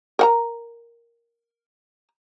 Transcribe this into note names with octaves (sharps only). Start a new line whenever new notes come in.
A#4 F#5 A#5